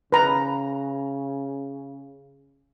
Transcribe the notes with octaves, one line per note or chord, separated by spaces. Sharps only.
C#3 B4 A#5